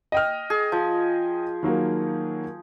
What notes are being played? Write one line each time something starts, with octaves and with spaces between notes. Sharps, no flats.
D#5 G5 F6
G#4
F3
D#3 F#3 A#3